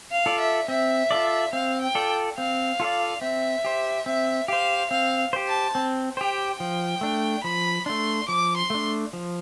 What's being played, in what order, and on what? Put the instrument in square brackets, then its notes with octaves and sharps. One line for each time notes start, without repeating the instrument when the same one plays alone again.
[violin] F5
[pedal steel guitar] F4 A4 D5
[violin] E5
[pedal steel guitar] C4 [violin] E5
[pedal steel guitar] F4 A4 D5
[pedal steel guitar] C4 [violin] F5
[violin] G5
[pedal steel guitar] F4 A4 D5
[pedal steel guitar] C4 [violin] F5
[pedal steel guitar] F4 A4 D5
[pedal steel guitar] C4 [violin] E5
[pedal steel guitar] G4 C5
[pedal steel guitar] C4 [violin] E5
[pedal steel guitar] G4 C5 [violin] F5
[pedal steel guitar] C4 [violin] F5
[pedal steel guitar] G4 C5
[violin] A5
[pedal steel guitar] C4
[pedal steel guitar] G4 C5 [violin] G5
[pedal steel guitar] F3 [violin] G5
[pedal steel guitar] A3 D4
[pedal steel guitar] F3 [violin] B5
[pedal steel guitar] A3 D4 [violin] C6
[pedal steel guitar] F3 [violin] D6
[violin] C6
[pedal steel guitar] A3 D4
F3